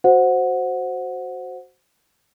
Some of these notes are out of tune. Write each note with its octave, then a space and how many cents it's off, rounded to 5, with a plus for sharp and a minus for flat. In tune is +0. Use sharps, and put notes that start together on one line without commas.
F#4 +0 C5 +0 F#5 -15